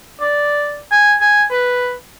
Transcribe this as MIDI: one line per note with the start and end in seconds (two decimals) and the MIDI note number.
0.21 0.78 74
0.91 1.14 80
1.21 1.44 80
1.51 1.93 71